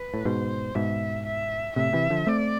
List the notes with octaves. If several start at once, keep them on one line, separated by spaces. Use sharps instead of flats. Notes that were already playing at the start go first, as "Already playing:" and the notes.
Already playing: B4
A2
G#2 B2 C5
G#2 B2 E5
E5
A2 C3 E5
C3 E3
D3 F3
A3 C4 D5